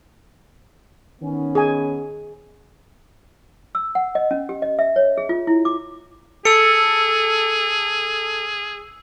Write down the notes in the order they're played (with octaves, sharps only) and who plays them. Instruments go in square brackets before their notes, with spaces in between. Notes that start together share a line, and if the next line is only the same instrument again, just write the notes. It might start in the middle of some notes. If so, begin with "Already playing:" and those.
[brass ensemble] D#3 B3 C#4
[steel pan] G#4 G#5
[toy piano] E6
F#5
D#5
C#4
G4
D#5
E5
C#5
G#4
F4
E4
D6
[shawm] G#4 [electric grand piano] A4 [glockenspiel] E6 C#7